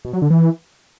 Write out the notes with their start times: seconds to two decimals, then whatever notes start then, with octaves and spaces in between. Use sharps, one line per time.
0.05 B2
0.13 F#3
0.22 D3
0.30 E3